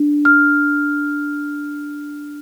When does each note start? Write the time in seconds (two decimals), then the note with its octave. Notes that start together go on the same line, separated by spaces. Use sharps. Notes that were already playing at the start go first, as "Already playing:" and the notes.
Already playing: D4
0.25 F6